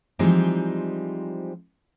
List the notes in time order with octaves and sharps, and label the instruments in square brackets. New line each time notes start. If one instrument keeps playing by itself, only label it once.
[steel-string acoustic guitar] E3 F3 G3 G#3 C4 D#4